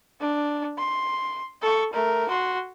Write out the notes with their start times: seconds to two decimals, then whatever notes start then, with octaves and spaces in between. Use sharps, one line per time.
0.21 D4
0.78 C6
1.62 A4 C#6
1.93 A3 A#4
2.29 F#4 C6